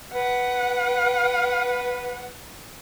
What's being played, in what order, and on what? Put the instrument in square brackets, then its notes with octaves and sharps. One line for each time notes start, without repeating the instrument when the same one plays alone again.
[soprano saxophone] B4 [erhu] F#5